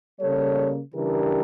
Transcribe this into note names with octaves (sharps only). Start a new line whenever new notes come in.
C#3 G3 A#3 A4 C#5
C#3 E3 G3 D4 G4 A#4